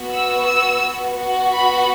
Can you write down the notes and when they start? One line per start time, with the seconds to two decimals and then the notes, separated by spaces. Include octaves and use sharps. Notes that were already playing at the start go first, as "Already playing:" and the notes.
Already playing: B3 F#4
0.13 E6
0.47 E6
1.17 B3 F#4
1.52 B5